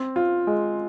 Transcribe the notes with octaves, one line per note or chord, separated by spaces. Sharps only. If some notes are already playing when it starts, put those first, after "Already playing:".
Already playing: C4
F4
G#3